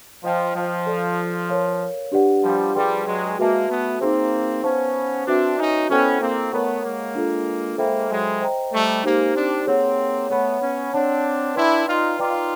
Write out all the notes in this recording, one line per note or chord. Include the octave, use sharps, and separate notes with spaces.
F3 C5 D#5 G5
F3
A4 D5 F5
A#4 C#5 F5
D4 G4 B4 D5 F#5
F3 G3
F3 G3 G#4 B4 D5 G5 C6
F#3 G#3
G#3 A#3 F#4 B4 E5 A5
A3 B3
A#3 C4 D#4 G#4 C5
B3 C#4 C5 F5 A5 C#6
C4 D4 F#4 B4 E5
C#4 D#4
B3 C#4 E4 A4 C5 D#5 G5
A#3 C4
A3 B3 A#4 C#5 F#5 A#5 C#6
G#3 A#3
D4 F4 A4
G#3 A#3 A4 C5 E5 G5 B5
F#3 G#3
C5 D#5 G5 A#5
G3 A3
G#3 A#3 D#4 G4 C5
C4 D4
A#3 C4 G#4 C#5 F#5
A3 B3 C#5 F#5 B5
B3 C#4
C4 D4 C#5 F#5 A5
D4 E4 B4 D5 G5 C6
D#4 F4
D#4 F4 B4 D5 G5 A#5 D6